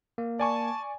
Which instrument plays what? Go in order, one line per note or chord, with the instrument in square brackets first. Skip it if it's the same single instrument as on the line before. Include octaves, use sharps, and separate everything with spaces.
[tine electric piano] A#3
[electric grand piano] D5 G#5 C#6 [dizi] A5